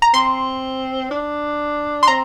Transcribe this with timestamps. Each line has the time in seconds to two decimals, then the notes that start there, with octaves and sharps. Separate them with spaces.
0.02 A#5
0.14 C4 C6
1.11 D4
2.03 C6
2.08 C4 A#5